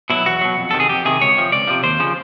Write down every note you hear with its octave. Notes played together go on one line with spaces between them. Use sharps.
B2 F#3 E4
E2 F#4
B2 F#3
F2
C3 D#3 A4
G#4
F2 G4
C3 D#3 G#4
C#2 C#5
C3 F3
C#2 D5
C3 F3
D#2 C5
C#3 F3